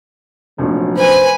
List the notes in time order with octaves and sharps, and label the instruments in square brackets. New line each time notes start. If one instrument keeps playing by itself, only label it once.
[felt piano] F1 A#1 [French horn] F#3
[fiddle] B4 G#5 [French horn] C5